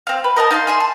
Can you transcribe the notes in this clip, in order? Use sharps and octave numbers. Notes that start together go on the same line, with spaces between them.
C4 F5
B4
A#4 D#5 F#5 A5
D#4 F5 A5 C6
G#4 E5 C6
A5